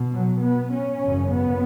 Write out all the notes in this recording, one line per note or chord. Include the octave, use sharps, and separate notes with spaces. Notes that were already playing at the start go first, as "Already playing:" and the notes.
Already playing: B2
F#3
B3
C#4
G#1 F#2 C#3
B3